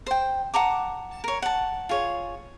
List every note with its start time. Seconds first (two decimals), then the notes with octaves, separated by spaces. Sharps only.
0.06 C5 G5
0.54 F#5 A5 A#5 D6
1.24 A#4 C#5
1.42 F#5 A5
1.89 F4 G#4 C#5